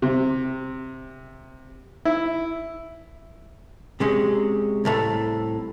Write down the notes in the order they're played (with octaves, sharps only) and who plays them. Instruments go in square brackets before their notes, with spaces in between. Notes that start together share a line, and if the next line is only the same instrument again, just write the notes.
[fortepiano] C3
E4
[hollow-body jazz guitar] C3 G#3 C#4
C2 A2 A3